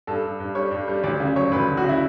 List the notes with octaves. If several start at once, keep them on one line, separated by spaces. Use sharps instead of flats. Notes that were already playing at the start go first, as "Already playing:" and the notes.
G2 A4
G2
G2
G3 C#5
G2
G3
D2 D5
C#3
F#3 C#5
D2 B4
D2
F#4
C#3 E4